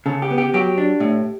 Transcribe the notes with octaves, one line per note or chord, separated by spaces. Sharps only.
C#3 A4
G4
B3
G4
F#3 G4
D4
A2